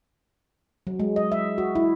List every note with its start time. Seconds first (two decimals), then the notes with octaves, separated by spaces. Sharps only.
0.87 F#3
1.00 G#3
1.16 D#5
1.32 E5
1.58 F#4
1.75 E4